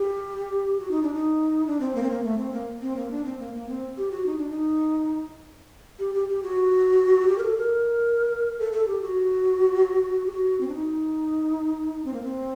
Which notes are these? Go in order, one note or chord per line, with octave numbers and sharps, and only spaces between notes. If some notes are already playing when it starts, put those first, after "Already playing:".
Already playing: G4
F#4
D#4
D4
D#4
D4
C4
A#3
C4
A#3
A3
C4
A#3
C4
A#3
D4
C4
A#3
A#3
C4
G4
F#4
D#4
D4
D#4
G4
G4
G4
F#4
G4
A#4
A4
A#4
A4
A4
G4
F#4
G4
F#4
C4
D4
D#4
C4
A#3
C4